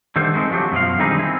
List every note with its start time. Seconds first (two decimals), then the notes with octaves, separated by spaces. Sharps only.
0.16 D3 D#3 G3 A3 G4 C5
0.34 G#3 A3 B3 C4 D#4
0.51 F3 F#3 A3 G4
0.72 F#2 B2 F3 F5
0.99 D3 D#3 G3 C4 D#4 G#4
1.19 C4 E4